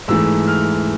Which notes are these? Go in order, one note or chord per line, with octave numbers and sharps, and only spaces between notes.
G#2 E3 A3 E6
F6